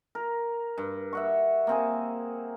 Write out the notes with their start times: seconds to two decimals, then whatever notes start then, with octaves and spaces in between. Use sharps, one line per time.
0.15 A#4
0.78 G2
1.13 E5 F#5 C#6
1.67 A#3 C4 G#4